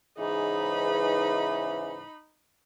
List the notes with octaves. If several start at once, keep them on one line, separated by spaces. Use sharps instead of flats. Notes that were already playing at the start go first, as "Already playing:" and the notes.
G#2 C#3 E3 D#4 G#4 B5